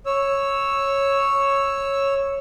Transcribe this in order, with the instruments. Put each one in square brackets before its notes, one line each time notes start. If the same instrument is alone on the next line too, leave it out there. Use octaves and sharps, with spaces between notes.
[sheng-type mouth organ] C#5 E6